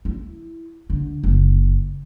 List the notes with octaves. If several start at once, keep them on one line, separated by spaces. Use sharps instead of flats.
E4
D3
F#1